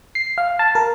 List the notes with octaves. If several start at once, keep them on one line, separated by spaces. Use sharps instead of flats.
C7
F5
A5
A#4